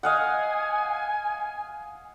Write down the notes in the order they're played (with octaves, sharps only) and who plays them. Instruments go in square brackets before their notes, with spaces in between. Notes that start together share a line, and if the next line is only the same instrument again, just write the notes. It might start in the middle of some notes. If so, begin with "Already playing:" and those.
[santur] D#5 F5 F#5 [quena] G#5